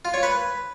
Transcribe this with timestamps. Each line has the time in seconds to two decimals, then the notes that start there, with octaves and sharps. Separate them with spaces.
0.05 F4
0.14 C#5
0.23 B4